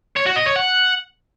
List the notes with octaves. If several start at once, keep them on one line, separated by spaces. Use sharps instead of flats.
C#5
F#4
D#5
C#5
F#5